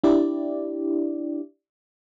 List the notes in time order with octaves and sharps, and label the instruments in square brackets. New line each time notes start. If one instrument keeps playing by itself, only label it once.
[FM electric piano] D4 E4 G4 D5